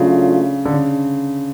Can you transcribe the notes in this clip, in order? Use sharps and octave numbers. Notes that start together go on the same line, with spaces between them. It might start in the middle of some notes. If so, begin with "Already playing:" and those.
Already playing: C#3 F#3 A3 D4 F4
D3
C#3